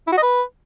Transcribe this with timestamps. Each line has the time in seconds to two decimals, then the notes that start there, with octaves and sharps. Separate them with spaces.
0.07 E4
0.12 F#4
0.17 D#5
0.23 B4